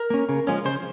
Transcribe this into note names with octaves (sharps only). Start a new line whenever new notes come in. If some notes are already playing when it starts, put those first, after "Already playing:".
Already playing: A#4
A#3 C#4
C#3
F3 G#3 C#4
C#3 C5